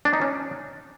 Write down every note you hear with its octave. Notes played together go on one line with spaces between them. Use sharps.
D4
D#4
C#4